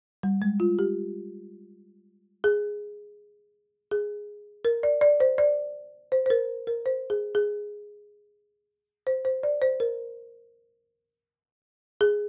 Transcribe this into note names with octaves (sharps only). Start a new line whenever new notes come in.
G3
G#3
F4
G4
G#4
G#4
A#4
D5
D5
C5
D5
C5
C5
A#4
A#4
C5
G#4
G#4
C5
C5
D5
C5
A#4
G#4